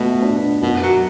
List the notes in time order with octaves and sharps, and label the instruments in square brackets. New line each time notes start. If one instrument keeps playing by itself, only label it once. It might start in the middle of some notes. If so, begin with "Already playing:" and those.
Already playing: [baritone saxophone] B2 [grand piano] A3
[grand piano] D4
[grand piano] F#2 [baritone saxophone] B2
[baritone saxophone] F#3